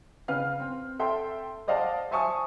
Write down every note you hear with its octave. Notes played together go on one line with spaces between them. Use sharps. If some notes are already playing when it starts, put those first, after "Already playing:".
C#3 B4 F5 F6
C4
A4 E5 G5 C6
C5 D5 D#5 F5 F#5 A5
C5 E5 G#5 A5 C#6 D#6